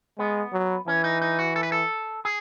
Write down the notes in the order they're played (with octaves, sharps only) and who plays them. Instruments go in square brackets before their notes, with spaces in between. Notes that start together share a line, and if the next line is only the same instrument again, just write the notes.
[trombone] G#3 [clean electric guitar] B3
[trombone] F#3
[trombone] E3 [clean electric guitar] C#4
[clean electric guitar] D#4
D#4
F#4
A4
B4
A4
G#4